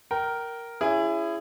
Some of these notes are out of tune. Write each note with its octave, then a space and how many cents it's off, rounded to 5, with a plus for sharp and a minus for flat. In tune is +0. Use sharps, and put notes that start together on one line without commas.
A#4 +0 G5 -25
C#4 +35 E4 +25 G#4 -10